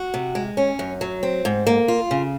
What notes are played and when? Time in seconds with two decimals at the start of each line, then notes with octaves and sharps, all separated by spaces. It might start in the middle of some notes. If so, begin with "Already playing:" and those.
Already playing: F#4
0.14 C3
0.35 G#3
0.57 C#4
0.79 F#2
1.01 F#3
1.23 C4
1.45 G#2
1.67 A#3
1.88 F4
2.11 C#3